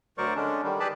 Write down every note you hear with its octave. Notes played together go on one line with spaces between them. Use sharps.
D2 F#3 A#4 C5 D5 C#6
D3 G#3 C#4 D4
D3 D#3 G3
G4 G#4 B4 D5 A5 B5